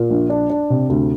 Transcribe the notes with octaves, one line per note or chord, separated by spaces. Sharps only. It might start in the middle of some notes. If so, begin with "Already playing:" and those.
Already playing: A#2
A#1
D4
D4
C3
D2